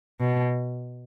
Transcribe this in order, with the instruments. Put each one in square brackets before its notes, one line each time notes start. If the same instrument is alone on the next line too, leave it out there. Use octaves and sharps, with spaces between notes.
[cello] B2